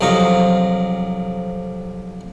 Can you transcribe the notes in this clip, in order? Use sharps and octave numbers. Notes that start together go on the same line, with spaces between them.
C2 F2 F#3 F4 D#5 C#6